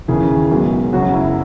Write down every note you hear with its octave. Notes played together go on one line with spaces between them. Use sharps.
D#2 C#3 E3 G#4
B1 B2 G#3
F#1 F#2 C#3 F#3 F#4
E4